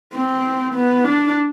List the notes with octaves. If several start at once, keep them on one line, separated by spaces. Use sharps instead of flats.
C4
B3
D4